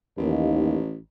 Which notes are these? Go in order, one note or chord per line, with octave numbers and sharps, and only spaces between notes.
A1 D#2